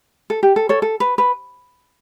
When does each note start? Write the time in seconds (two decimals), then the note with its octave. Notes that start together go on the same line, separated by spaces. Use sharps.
0.30 A4
0.43 G4
0.56 A4
0.69 A4 C#5
0.82 A4
1.00 B4
1.18 B4